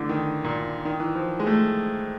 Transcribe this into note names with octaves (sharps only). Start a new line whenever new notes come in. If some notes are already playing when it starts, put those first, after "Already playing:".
Already playing: D3 E3 A3
D#3
A#2
D#3
E3
F3
G#3
A3